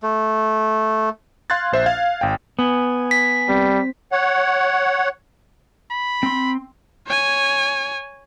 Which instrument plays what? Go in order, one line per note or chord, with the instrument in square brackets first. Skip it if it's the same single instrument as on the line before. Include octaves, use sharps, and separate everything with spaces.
[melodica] A3
[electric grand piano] F5 C6 F#6 G#6 A6
A#1 C5 E5
F5 G#6
G#1 G5
[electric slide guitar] B3 [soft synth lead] G#5
[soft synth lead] G#5 [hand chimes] B6
[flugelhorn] G3 [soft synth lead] C4
[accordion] C#5 F#5
[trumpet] B5
[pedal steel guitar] C4 C6
[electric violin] C#5 G#5